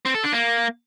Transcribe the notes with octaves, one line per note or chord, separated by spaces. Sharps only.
C4
A4
D4
A#3